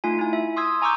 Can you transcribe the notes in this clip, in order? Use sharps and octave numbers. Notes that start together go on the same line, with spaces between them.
A3 D#4 F4 G#5
E4 G#5
E5
C6 D#6 E6 G#6
G#5 A#5 C#6 D6 E6 G6